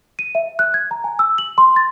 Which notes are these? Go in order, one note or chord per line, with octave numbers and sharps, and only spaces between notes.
D#7
E5
F#6
G#6
A#5
G#5
E6
F#7
C6
A6